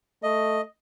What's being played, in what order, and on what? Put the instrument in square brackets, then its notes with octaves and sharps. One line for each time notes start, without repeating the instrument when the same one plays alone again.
[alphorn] A3 [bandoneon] D#5